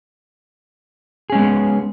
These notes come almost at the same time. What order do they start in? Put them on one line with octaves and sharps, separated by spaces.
G#4 C#4 G#3 B3